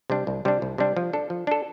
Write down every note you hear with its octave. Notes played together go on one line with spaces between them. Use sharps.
C3 G3 D4
C2
C3 G3 D4
C2
C3 G3 D4
F3
D4 A4
F3
D4 A4